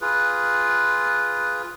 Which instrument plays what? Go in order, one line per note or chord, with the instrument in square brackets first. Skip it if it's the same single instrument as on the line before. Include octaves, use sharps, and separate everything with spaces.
[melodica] F4 G#4 B4